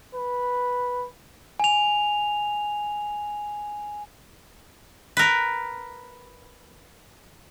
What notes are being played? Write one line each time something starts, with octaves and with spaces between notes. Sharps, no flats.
B4
G#5 F7
A#4 B4